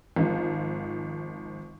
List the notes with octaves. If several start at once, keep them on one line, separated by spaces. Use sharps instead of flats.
G#1 G#2 F3